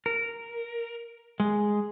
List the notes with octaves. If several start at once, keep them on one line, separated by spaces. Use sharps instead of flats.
A#4
G#3